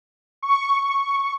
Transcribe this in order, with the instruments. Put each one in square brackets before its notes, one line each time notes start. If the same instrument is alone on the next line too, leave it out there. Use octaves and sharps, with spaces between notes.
[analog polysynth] C#6